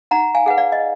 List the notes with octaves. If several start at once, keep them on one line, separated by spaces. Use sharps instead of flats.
D#4 F#5 A#5
F5 G#5
G#4 B4 F#5
D5 F5
D#5